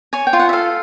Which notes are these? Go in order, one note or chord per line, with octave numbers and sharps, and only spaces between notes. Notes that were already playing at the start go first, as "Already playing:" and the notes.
C#5 G#5
G5
F4
F#5
E5
A4 F5